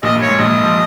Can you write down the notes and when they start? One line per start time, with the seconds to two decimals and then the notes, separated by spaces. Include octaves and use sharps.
0.03 A#1 A#2 D#5
0.15 G2
0.21 C#5
0.27 G#2
0.39 A#1 A#2 D#5
0.63 F3